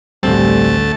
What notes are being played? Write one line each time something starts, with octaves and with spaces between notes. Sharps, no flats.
A1 D2 G3 A3 C4 A5